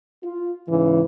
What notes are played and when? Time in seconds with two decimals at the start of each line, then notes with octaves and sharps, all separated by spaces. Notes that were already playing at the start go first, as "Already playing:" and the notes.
0.24 F4
0.69 G#2 C#3 E3